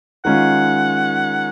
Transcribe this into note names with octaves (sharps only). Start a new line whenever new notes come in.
D#3 G#3 C#4 F4 F#5